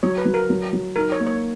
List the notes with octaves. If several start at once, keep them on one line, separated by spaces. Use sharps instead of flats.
F#3 C#5
B4
F#3
A#4
F#3
F#3
D#4 A#4
C#5
A#3
C#5